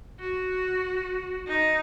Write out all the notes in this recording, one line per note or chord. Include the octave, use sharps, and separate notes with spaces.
F#4
D#4